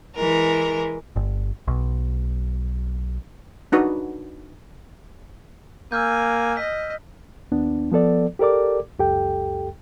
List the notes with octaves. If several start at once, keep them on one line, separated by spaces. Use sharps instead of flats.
E3 G#3 A#4
G1
B1
D4 D#4 F#4 B4
A#3 G#5 E6 F6 G6
D#5 B6
D#2 B3 D4
F3 B3 A4 D5
G4 A4 A#4 D5 D6
C#2 F#2 G4 A4 G5